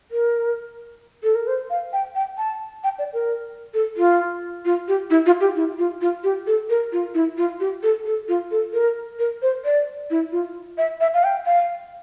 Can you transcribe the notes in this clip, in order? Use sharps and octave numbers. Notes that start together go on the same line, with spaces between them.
A#4
A4
A#4
C5
F5
G5
G5
A5
G5
D5
A#4
A4
F4
F4
G4
E4
F4
G4
E4
F4
F4
G4
A4
A#4
F4
E4
F4
G4
A4
A4
F4
A4
A#4
A#4
C5
D5
E4
F4
E5
E5
F5
G5
F5